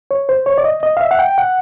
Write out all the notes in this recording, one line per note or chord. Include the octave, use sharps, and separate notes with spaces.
C#5
C5
C#5
D5
D#5
D#5
F5
E5
F#5
G5
F#5